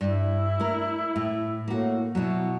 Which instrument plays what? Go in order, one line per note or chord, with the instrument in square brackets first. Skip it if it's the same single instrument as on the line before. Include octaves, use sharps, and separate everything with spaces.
[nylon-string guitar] G2 [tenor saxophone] E4
[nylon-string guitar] A3 A#4
[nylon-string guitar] A2 [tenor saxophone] E4
[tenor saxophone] A2 [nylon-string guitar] A#3 F#4
[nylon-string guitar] B2 F#3 [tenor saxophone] E4